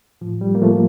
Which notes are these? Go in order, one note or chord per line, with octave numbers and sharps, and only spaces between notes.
A2 F3
G3
A#3
A2 F3 A3